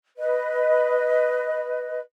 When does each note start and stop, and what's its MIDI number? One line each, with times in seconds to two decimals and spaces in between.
0.17 1.99 71
0.17 1.99 75